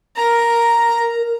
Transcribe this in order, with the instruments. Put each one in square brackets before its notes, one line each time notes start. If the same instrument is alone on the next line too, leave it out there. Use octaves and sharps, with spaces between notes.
[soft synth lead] A#4 [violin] A#5